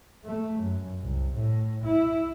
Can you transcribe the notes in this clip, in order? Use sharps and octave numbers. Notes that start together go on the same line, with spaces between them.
A3
F#2
C2
A2
E4